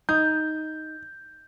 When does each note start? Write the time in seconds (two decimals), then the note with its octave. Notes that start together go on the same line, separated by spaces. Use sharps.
0.09 D#4 G6